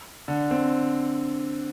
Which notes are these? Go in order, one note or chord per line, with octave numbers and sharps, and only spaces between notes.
D3
C4